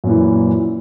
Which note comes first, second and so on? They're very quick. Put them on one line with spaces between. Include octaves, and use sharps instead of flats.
F#2 A#2 E3